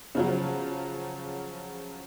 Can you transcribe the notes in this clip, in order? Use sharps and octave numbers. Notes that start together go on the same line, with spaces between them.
C#3 F3 F#3